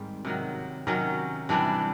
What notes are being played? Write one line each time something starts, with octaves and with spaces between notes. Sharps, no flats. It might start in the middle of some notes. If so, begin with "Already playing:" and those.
Already playing: G#2 D#3 G3 C4
C3 D#3 F#3
C3 D#3 F#3 C#4
C3 E3 G3 D4